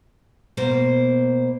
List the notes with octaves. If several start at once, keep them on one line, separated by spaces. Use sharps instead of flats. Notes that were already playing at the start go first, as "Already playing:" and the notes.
B2 A#3 C5